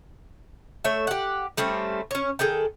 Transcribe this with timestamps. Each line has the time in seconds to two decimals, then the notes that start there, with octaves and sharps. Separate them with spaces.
0.84 A3 C#5 E5
1.07 G4 F#5
1.57 G3 A3 C4 C#4
2.11 C#4 C#5
2.39 D#3 G#4 A4 G5